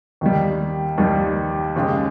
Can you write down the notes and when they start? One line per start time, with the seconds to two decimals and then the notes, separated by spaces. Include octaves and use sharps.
0.21 D#2 D#3 G3
0.98 D#2 D#3 G3
1.76 D#2 C#3 G#3